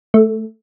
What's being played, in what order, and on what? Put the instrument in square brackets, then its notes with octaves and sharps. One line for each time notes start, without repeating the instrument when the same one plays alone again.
[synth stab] A3